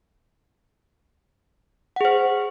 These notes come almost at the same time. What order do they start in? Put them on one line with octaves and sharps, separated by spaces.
F#5 G#4 C5